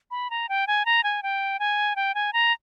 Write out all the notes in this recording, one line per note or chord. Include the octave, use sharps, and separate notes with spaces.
B5
A#5
G5
G#5
A#5
G#5
G5
G#5
G5
G#5
A#5